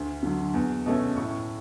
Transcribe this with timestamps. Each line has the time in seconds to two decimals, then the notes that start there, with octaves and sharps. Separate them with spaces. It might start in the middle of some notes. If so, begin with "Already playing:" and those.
Already playing: D2
0.23 D3 F#3
0.54 E2
0.86 B2 A3 C#4
1.17 A2 C#6